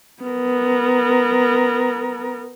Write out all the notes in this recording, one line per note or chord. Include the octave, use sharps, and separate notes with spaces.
B3 A#4